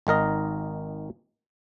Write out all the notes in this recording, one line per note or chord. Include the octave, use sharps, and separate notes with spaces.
G#1 D#3 A#4 D#5